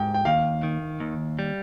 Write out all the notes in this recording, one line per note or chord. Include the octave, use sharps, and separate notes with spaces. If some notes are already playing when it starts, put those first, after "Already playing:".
Already playing: G#2 G5
G5
D#2 F5
D#3
D#2
G3